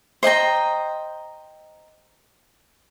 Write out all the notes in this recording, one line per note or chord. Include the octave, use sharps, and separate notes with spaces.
C5 D#5 G5 A#5